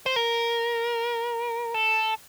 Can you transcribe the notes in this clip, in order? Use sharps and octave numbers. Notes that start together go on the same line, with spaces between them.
C5
A#4
A4